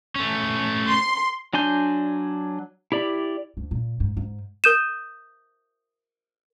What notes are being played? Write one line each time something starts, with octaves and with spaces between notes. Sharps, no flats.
A3 C#4
C6
F#3 D4 G#5 C6 G6
E4 G4 D5
D2
A#2
G#2
G#2
A#4 D#6 G6 D#7 E7